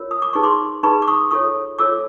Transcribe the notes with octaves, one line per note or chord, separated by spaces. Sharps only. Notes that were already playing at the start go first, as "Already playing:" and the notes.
Already playing: F4 A#4 C#5
D#6
D6
D#4 G#4 B4 C#6
C6 D6
D#4 G#4 B4 B5 C#6
D6
C#6 D#6
F4 A4 C#5 C#6 D#6
F4 A4 C#5 D6 E6